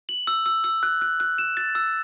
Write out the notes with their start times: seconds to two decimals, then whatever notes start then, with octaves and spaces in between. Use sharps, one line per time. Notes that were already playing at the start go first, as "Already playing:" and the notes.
0.09 F#7
0.27 E6
0.46 E6
0.64 E6
0.83 F#6
1.01 F#6
1.20 F#6
1.38 E7
1.57 A6
1.75 E6